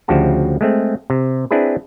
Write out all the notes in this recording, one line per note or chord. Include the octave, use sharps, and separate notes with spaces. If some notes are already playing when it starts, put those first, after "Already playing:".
D2 C#3 F3 F#4 G4 A5
G#3 A3 C4
C3
C4 D4 E4 G#4 B4